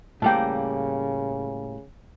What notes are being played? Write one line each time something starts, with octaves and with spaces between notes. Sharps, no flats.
A2 C#3 G3 A#3 G5 A5